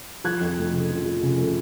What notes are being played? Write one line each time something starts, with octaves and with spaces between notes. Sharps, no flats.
F3 F#6 G#6
F2
A3
C#3
F3
F3
C#3
A3